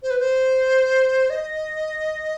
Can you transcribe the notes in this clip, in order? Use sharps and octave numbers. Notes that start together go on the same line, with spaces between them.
C5
B4
C5
D#5